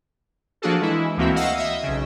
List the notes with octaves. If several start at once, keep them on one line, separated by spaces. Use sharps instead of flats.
F3 A#3 D4 F#4 G#4 A4
E3 G#3 E4
D2 E3 A#3 C4 F#4 E5
D#5 F5 F#5 E6
D#5 E5
B1 C#3